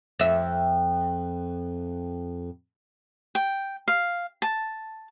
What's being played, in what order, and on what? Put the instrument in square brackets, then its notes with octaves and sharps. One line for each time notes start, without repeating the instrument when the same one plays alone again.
[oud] F2 E5
[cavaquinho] G5
F5
A5